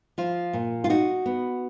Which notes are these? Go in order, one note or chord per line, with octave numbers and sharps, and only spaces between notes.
F3 F4
A#2
F4
D#4 F#4
B3